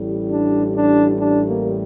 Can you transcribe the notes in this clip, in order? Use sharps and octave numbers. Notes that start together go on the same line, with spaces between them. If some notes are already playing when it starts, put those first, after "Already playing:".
Already playing: A1 A2 G3
D4
D4
D4
A#3